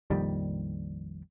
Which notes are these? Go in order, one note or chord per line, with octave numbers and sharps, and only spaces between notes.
A#1 F2 D#3 G3